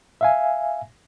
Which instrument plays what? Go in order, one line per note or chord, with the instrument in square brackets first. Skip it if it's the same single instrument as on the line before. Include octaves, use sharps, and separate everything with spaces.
[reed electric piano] E5 F5 G#5